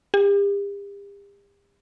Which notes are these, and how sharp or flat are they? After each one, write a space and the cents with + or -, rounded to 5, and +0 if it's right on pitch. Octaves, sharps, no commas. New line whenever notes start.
G4 +40